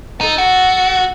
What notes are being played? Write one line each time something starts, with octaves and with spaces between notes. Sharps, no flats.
D#4 A4
F#4